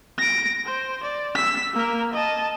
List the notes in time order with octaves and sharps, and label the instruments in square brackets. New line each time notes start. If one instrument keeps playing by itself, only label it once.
[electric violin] A#6 D7
C5
D5
E6 B6
A#3 A#4
D#5 A5